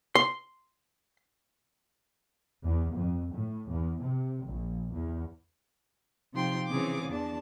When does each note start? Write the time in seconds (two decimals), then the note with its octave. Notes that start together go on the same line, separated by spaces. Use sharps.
0.15 C6
2.63 E2
2.93 F2
3.34 A2
3.70 E2
4.02 C3
4.45 A#1
4.93 E2
6.33 C3 F3 D#4 G5 C6
6.67 C#3 E3 C4 G#4 D6
7.08 E2 D4 A5